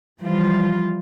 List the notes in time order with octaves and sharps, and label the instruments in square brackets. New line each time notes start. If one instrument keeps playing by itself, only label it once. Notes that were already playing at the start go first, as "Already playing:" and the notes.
[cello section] E3 F3 G3 F4